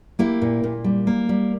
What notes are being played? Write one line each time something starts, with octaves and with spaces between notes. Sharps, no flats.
A#3 E4 G4
A#2
A#2
G3
A#3
G3